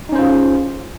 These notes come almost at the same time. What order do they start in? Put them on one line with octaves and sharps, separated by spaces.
D#4 C#4 C5 F4 G#4